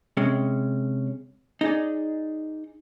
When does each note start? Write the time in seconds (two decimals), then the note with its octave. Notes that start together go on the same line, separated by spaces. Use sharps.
0.17 C3 G#3 C#4
1.61 D#4 G#4 D5